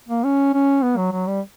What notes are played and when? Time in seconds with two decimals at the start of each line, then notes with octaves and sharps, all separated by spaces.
0.09 A#3
0.24 C#4
0.53 C#4
0.82 B3
0.97 F#3
1.12 F#3
1.27 G3